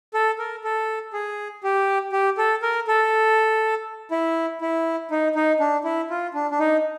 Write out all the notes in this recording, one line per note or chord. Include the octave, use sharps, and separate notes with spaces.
A4
A#4
A4
G#4
G4
G4
A4
A#4
A4
E4
E4
D#4
D#4
D4
E4
F4
D4
D4
D#4